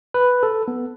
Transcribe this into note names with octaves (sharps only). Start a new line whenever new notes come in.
B4
A4
B3